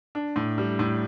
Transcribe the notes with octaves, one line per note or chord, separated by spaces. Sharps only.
D4
A2
G3
A2